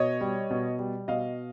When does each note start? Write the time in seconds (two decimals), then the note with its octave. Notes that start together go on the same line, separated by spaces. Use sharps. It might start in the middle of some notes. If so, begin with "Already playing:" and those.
Already playing: B2 C#5 D#5
0.21 G3
0.50 B2
0.79 G3
1.08 B2 D#5 F5